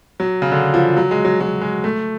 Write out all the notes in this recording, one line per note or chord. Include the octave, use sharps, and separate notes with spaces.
F#3
C#3
D3
F3
F#3
G#3
F#3
F#3
G#3
A3